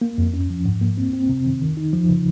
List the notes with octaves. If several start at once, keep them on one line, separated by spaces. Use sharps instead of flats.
A#3
F2
C#4
F3
G#2
A#3
C4
C4
C3
D#3
D#3
D#4
F3
C#3